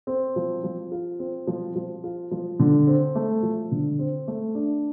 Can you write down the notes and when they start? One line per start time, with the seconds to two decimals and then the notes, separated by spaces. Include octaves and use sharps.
0.07 C4
0.36 F3
0.64 F3
0.92 F4
1.19 C4
1.47 F3
1.76 F3
2.04 F4
2.31 F3
2.60 D3
2.87 C4
3.15 A3
3.43 F3
3.72 D3
3.99 C4
4.28 A3
4.55 D4